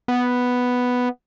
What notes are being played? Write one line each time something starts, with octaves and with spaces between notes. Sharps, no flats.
B3